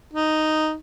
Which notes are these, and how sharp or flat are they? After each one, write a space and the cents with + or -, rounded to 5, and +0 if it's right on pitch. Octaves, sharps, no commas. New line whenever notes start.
D#4 -5